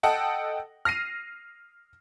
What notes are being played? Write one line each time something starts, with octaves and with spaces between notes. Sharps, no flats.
A4 D#5 F#5 G5 A5
F6 A#6 C7 D#7